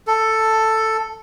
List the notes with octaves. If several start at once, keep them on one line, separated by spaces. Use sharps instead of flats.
A4